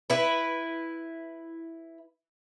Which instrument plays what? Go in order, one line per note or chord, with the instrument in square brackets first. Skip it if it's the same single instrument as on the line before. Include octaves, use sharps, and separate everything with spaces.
[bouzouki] E4 B4